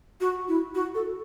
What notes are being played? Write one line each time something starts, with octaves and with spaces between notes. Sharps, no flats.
F#4
E4
F#4
A4